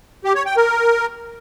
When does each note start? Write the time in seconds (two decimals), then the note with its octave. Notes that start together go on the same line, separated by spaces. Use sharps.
0.24 G4
0.35 C#5
0.46 G5
0.57 A#4